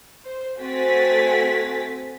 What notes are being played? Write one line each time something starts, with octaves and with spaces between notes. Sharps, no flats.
C5
A3 C4 F#4 G#5 A6 B6